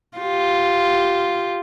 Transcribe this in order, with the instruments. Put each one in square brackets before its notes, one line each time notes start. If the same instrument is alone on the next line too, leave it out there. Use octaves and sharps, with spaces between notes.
[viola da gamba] F4 G4